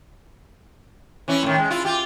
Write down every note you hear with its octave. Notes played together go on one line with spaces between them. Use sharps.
E3 C#4 E4
A2 D#3
G#3
E4 F4
F4 G4